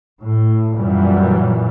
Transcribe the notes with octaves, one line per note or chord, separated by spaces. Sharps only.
A2
F#2 A#2 E3 F#3 G3